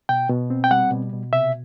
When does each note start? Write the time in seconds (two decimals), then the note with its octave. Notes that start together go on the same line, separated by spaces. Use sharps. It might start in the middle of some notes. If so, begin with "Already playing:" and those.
0.09 B2 G5
0.30 B2
0.50 C4
0.64 G5
0.71 G3 F#5
0.91 B2
1.12 B2
1.33 C3 E5